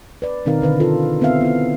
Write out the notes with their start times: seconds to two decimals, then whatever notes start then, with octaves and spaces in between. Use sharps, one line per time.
0.22 B4 D5
0.45 B2 D#3 C4 D#4 A#4 F5
0.62 D3 B4 F5
0.80 F4 A4
1.21 B3 C4 B4 E5 F5
1.41 B3 E4